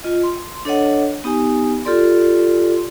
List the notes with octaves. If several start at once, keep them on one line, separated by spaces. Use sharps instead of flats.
F4 D#5
C6
D4 A4 C#5 D#5 F#5
B3 D#4 G4 G#5
F4 G4 A4 D5 C6